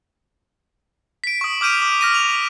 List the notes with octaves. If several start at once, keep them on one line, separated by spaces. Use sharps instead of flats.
B6 D7
C#6 D#6
D6 F6 G6 D7 D#7
D6
F6 A#6 D#7
F7